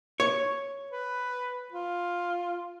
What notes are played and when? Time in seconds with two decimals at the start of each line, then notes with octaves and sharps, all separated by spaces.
0.20 C#5
0.91 B4
1.72 F4